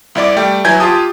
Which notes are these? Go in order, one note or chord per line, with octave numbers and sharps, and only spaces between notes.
C2 E4 D5 D6
G3 A3 D5 G5
F#3 E4 B4 G#5 G6 G#6
F4 G4 A5 D#6